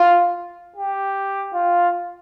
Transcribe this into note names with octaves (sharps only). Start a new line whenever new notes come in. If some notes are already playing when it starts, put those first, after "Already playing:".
Already playing: F4
G4
F4